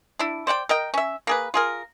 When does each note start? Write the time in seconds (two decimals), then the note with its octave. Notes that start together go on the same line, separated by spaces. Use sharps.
0.19 D4 E4
0.47 C5 D5 F#5 G5
0.69 A#4 D#5 G5
0.94 C#4 E5
1.27 A#3 G#4 B4
1.54 F4 G#4 A#4